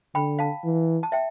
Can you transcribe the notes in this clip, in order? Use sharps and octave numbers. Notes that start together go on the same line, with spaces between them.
D3 G5 B5
F5 A5
E3
A5
E5 G5